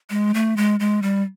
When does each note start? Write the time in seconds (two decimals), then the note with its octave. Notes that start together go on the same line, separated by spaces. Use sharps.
0.10 G#3
0.34 A3
0.57 G#3
0.80 G#3
1.02 G3